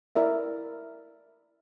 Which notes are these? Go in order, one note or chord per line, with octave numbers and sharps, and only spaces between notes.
E4 A#4 D5 E5